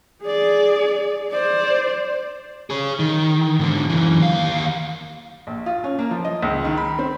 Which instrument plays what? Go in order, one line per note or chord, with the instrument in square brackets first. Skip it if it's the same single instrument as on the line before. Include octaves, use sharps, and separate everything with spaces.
[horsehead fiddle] G#4 D5
C5 D5
[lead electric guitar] G#4 C#5
D#3
G#2 D3
F#2 E3
D#2 F5
[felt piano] A#1
F4
C#4
A#3
F3
D#5
C#2
D#3
B5
C4